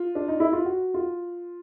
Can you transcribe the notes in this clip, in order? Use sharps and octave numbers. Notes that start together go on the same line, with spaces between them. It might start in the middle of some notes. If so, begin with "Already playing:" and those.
Already playing: F4
D4
D#4
E4
F4
F#4
F4